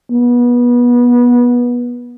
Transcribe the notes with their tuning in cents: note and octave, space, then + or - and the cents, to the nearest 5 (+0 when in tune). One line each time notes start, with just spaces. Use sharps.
B3 -25